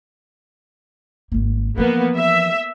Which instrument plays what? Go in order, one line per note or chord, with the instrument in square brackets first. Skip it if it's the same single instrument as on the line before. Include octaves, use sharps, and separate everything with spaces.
[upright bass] G#1 A#3
[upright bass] E3 F3 [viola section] A#3 B3
[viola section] E5